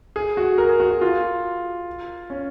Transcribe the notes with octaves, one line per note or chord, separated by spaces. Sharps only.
G#4
F#4
A#4
G#4
F#4
F#4
F4
C#4